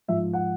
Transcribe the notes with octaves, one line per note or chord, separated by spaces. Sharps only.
G#2 F3 E5
F#5